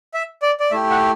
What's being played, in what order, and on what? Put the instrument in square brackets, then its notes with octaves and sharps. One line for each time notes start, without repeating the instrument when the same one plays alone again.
[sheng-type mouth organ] E5
D5
D5
A3 E4 G4 E5
F#5